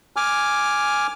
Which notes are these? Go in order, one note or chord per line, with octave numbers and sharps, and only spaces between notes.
G#5 D6 F6